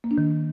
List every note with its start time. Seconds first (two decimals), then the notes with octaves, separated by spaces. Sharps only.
0.04 A#3
0.11 D4
0.18 D#3